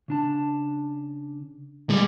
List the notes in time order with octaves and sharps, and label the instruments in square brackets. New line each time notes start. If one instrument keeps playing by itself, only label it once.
[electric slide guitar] C#3 D4 A5
[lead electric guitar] G3 G#3